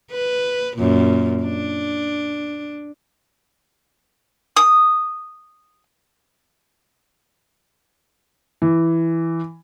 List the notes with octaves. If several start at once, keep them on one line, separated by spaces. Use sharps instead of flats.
B4
F#2 A#2
D4
D#6
E3